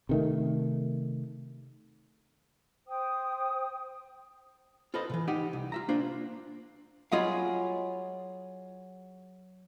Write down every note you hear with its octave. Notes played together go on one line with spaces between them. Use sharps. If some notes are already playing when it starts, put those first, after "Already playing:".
C3 D#3 A3
C5 G5 D#6
F4 A4 B4 C5 D#5
B2 E3
D#4 G4 D#5 F#5
C2
F4 E5 A#5
A#3 D4 F4 C5
F#3 F4 G#4 D#5 F5 B5